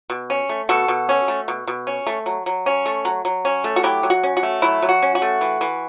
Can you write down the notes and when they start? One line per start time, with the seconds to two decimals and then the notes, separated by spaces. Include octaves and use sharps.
0.10 B2
0.30 C#4
0.49 A3
0.69 B2 F#4 A4
0.88 B2
1.09 C#4
1.28 A3
1.48 B2
1.67 B2
1.87 C#4
2.07 A3
2.26 F#3
2.46 F#3
2.66 C#4
2.86 A3
3.05 F#3
3.25 F#3
3.45 C#4
3.64 A3
3.76 F#4
3.83 F#3 E4 G4
4.03 F#3
4.10 F#4
4.23 C#4
4.37 F#4
4.43 A3
4.62 F#3 E4
4.83 F#3
4.89 F#4
5.02 C#4
5.15 F#4
5.22 A3
5.41 E3
5.61 E3